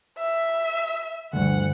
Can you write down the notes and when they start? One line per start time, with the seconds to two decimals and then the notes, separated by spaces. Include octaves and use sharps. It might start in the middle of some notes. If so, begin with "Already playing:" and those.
0.18 E5
1.33 D2 G2 F#5